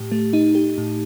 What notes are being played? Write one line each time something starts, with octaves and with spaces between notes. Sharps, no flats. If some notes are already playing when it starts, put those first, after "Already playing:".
Already playing: A2 G4
A3
D#4
G4
A2